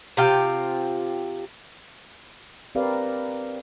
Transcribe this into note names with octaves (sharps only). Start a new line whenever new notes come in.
C3 F4 G5
C4 G4 A#4 B4 D5 F5